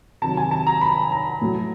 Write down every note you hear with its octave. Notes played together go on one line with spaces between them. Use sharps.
C3 D#3 F#3 A5
G#5
A5
A#5
B5
A#5
A2 F#3